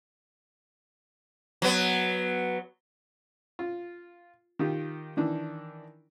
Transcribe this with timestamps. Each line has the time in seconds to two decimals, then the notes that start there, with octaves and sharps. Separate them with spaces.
1.62 F#3 B3
3.59 F4
4.59 D#3 F4 G4
5.17 D#3 E3 D4